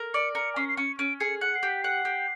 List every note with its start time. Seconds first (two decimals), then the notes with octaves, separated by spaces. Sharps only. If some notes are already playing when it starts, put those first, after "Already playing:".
Already playing: A#4
0.14 D5 C#7
0.35 A#4 C#7
0.56 C#4 C7
0.69 C7
0.77 C#4 C#7
0.99 C#4 D7
1.20 G#4 C#7
1.41 F#5 C#7
1.55 C7
1.63 G4
1.68 B6
1.82 F#5 C7
2.05 G4